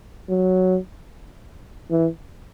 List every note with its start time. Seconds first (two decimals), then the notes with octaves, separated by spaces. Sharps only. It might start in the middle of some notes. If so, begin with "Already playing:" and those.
0.30 F#3
1.91 E3